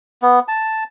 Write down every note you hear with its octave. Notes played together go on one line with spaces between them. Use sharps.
B3
A5